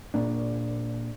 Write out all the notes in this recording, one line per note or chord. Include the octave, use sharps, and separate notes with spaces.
A#2 A#3 D4